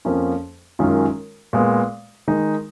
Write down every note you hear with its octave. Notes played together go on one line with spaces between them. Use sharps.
F2 F3 A#3 C#4
F#2 D#3 G#3 C#4 F4
A#2 G#3 B3
D#3 G#3 D#4